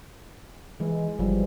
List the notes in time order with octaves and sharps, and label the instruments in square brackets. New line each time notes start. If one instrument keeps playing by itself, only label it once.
[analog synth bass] E3 [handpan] G#3
[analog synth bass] G1 [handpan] E3 F3 G3